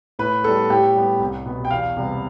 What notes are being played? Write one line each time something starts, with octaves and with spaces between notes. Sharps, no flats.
A2 B4
G3 B3 A4
A2 G4
G3 B3
C2
B2 B3
G5
E2 F5
C3 G3 B3